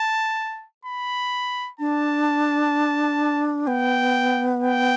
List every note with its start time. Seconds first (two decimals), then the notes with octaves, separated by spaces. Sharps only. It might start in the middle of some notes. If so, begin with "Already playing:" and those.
Already playing: A5
0.85 B5
1.79 D4 A5
3.67 B3 G5
4.62 G5